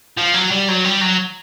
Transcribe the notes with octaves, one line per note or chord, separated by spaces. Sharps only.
F3
F#3
G3
F#3
G3
F#3